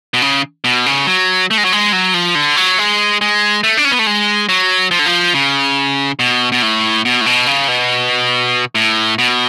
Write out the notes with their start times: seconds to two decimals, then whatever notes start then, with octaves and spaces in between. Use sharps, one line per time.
0.14 B2
0.22 C#3
0.64 B2
0.86 C#3
1.07 F#3
1.51 A3
1.58 G#3
1.65 F#3
1.72 G#3
1.93 F#3
2.14 F3
2.35 D3
2.57 F#3
2.78 G#3
3.21 G#3
3.64 A3
3.77 D4
3.85 C#4
3.92 B3
3.99 A3
4.07 G#3
4.49 F#3
4.91 F3
4.99 D3
5.06 F3
5.34 C#3
6.19 B2
6.52 B2
6.62 A2
7.05 B2
7.21 A2
7.26 B2
7.47 C#3
7.68 B2
8.75 A2
9.19 B2